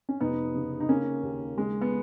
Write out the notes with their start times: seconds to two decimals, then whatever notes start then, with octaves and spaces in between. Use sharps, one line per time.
0.09 C#4
0.21 F1 B3 D#4
0.55 C#3
0.80 D#4
0.89 C#3 A#3 C#4
1.23 D#2
1.57 C#3 G#3
1.81 B3